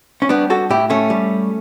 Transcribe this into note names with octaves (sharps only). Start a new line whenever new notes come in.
C#4
G3 B3 D4
F#4 A4
A2 E4 G4
A3 C#4
G3